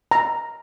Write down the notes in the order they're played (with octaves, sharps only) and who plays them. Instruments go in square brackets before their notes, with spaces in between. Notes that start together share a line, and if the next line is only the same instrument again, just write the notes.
[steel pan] A#5